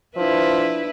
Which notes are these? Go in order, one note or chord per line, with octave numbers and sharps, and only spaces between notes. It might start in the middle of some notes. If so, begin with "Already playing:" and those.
F3 D4 E4 B4